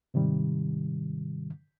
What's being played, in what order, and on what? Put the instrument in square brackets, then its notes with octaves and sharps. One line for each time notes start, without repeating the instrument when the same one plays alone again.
[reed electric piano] G#2 C3 D#3 G3